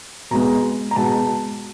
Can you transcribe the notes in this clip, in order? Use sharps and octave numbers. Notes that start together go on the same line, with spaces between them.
B2 G#3 B3 A#5
A#5
B2 G#3 B3 A5